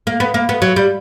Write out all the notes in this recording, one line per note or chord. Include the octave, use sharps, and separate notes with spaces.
A#3
B3
A#3
B3
F#3
G3